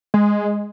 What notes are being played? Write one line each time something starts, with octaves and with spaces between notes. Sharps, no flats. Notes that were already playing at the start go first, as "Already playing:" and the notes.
G#3